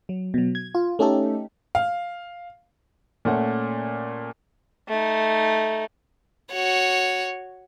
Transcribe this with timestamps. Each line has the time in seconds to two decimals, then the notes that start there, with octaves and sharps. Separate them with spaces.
0.09 F#3
0.34 B2 F#3
0.55 G#6
0.75 F4
0.99 A3 C#4 D#4 G4 A4
1.75 F5
3.25 A#2 A3 C#4 F#5
4.88 A3 D#4
6.53 F#4 C#5